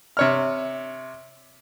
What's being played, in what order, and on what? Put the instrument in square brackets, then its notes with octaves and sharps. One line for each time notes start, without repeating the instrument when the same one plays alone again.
[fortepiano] C3 C#5 F6